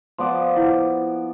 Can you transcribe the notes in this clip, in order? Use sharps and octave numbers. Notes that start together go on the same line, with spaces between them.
F3 B3 D5 C6
E4 F#5